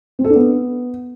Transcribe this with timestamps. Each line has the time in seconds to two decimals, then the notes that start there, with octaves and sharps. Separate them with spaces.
0.19 C4
0.24 A4
0.30 D4
0.36 B3